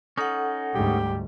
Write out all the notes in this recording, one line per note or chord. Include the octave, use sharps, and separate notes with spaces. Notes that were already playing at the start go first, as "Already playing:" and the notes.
C#4 D#4 A4 F#5
D2 G#2 G3 G4